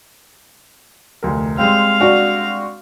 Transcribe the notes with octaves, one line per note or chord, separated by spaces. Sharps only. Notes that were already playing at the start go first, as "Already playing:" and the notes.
F1 D2 A#4
G3 G#3 C4 F5
D4 F#4